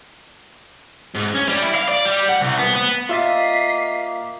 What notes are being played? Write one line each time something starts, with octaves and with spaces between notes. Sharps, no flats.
G#2
C#4
G3
E4
F5
D5
G3
F#5
C2
B3
B3
A#3 F4 D#5 E5 A6 B6 C7